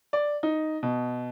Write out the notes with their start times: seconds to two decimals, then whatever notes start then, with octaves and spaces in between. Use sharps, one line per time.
0.13 D5
0.43 D#4
0.83 B2